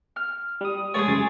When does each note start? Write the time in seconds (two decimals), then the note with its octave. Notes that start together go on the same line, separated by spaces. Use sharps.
0.16 F6
0.61 G3 D#6
0.94 G#3 A3 G#4 C#5 A5
1.08 C#2 F#2 A6